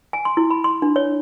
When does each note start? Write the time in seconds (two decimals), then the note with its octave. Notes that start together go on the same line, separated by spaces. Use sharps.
0.13 G#5
0.25 C6
0.37 E4
0.50 B5
0.64 C6
0.82 D4
0.96 C#5